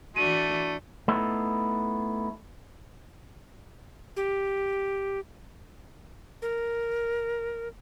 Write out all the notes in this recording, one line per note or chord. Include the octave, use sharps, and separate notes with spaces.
E3 A3 D4 F#4 D#7
A3 B3 D#4 E4
G4
A#4